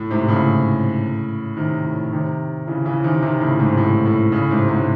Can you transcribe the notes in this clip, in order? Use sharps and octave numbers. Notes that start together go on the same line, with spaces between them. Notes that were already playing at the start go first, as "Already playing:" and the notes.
Already playing: A2
G#2 C3
A2 C#3
C3 D#3
A2
C3 D#3
C#3 E3
C#3 E3
C3 D#3
C3 D#3
A2 C#3
G#2 C3
A2
A2
A2 C#3
G#2 C3
G#2 C3